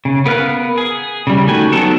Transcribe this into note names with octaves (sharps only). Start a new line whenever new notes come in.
C#3
B3 A#4 F5 F6 F#6
G#4
C#3 G3
D#3 A3 F#4 G4 G#5
D#3 F#3 B3 A4 A#4